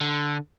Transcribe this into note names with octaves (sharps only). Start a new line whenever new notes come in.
D3